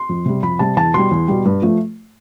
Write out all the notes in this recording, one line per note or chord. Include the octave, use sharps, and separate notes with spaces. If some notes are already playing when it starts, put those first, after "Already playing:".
Already playing: C6
F2
C3 G3
F2 B5
C3 G3 A5
E2 A5
B2 G3 C6
E2
B2 G3
G2
F3 A3